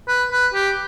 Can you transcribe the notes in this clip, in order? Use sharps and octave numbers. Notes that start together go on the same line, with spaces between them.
B4
B4
G4